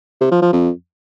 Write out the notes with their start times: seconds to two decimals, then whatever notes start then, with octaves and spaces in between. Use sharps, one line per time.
0.21 C3
0.32 F3
0.42 F3
0.53 F2